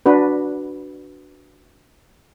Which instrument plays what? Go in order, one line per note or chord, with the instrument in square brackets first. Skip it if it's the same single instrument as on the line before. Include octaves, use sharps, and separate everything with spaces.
[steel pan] D4 F#4 B4